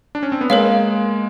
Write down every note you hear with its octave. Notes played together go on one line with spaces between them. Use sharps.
D4
C#4
C4
B3
G#3 A#3 A#4 C#5 F5